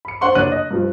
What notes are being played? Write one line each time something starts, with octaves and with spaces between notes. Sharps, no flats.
B5 C#7
D4 C5 F#5 C6 C#6
F#1 D4 C#5 F#6 D#7 F#7
D#5
G2 F3